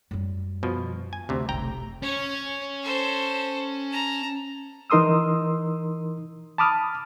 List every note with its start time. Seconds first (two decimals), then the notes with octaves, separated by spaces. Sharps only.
0.11 F#2 G3
0.63 B2 F3
1.13 G#5
1.29 D2 C3
1.49 F1 B1 G5 A#5
2.03 C#4 C#5
2.83 A4 C5
3.91 A5 A#5
4.90 E3 D#4 A#4 C6 D#6 E6
6.58 A5 B5 D6 D#6 F6